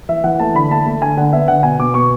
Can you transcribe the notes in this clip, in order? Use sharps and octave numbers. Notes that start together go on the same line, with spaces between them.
E3 E5
E3 F#5
A3 A5
D3 B5
A3 A5
A3
D3 G#5
D3 F#5
B3 E5
D3 F#5
B2 G#5
B2 D6
B2 C#6